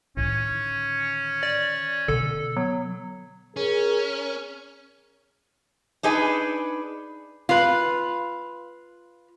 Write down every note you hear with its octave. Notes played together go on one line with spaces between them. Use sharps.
A2 D3 D#3 C#4
D5
B2 D3 A4
F#3 B3
C#4 G#4 A#4
D4 D#4 G#4 B4
F4 B4